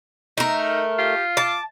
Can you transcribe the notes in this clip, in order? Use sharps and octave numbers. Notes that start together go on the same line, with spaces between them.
A3 D#4 A#4
F4 G4
A5 D6